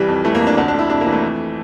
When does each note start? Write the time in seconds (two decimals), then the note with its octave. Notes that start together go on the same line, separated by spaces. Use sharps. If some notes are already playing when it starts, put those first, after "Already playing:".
Already playing: C2 E3 G3
0.08 F2
0.24 E3 A3
0.35 A#3
0.40 F2
0.47 D4
0.57 D2 D4
0.68 D4
0.74 D2 E4
0.90 C3 D4
1.01 A#3
1.07 E3
1.12 A3
1.22 F2